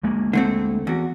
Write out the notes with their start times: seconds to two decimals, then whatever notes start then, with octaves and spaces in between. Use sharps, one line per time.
0.03 D2 G#3 A#3
0.33 D3 A3 C4
0.87 E2 F#4